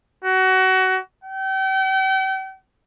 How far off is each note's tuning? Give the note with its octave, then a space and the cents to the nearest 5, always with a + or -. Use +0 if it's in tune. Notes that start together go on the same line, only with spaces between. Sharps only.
F#4 +25
G5 -40